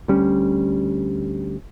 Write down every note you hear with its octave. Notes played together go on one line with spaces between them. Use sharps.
D2 G3 C#4